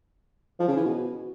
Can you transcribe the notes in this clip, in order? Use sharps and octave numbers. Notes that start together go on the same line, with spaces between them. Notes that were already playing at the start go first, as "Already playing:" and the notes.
F3
C#3
E3
B2